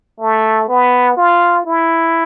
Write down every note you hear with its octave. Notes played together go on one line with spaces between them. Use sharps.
A3
B3
F4
E4